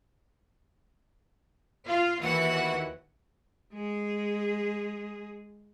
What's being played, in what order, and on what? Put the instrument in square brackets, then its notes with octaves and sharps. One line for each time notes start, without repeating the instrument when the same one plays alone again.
[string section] F4 F5
[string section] D#2 E3 [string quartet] F#4 F#5
[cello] G#3 G#4